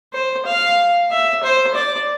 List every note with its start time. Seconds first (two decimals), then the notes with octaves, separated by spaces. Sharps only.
0.13 C5
0.45 F5
1.11 E5
1.43 C5
1.75 D5